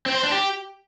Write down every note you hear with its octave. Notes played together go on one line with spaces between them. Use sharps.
C4
C5
D4
G4